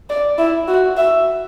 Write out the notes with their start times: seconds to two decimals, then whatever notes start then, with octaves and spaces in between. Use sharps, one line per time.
0.10 D5
0.38 E4
0.67 F#4
0.97 E5